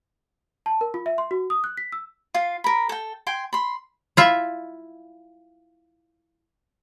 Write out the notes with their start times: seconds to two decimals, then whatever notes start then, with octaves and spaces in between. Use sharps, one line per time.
0.66 A5
0.81 A#4
0.94 F4
1.06 E5
1.18 C6
1.31 F#4
1.50 D#6
1.64 F#6
1.77 B6
1.92 E6
2.34 F4 F5
2.64 A#4 B5
2.89 A4 G5
3.27 G5 G#5 C6
3.53 B5 C6
4.17 E4 F4 E5